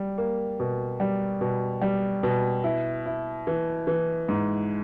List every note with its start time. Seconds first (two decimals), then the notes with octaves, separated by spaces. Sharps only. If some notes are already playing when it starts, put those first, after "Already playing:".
Already playing: G3
0.18 A#3
0.60 B2
1.00 G3
1.41 B2
1.82 G3
2.23 B2
2.64 E4
3.06 E4
3.47 E3
3.87 E3
4.29 G#2